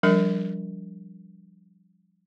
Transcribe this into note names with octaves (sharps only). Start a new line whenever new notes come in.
F3 G3 D4 A#4